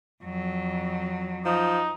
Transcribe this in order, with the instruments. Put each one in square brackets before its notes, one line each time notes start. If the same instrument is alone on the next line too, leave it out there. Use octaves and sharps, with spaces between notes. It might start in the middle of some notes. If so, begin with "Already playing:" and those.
[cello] F2 F#3
[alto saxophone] F3 [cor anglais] D#4